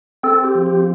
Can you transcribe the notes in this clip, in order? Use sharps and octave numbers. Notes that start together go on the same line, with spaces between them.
C4 A4
G4
F3
G4